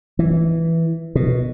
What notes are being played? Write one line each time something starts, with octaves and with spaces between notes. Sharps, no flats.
E3
B2